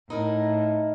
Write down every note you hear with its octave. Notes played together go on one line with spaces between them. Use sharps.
A2 D#4 E4 A#4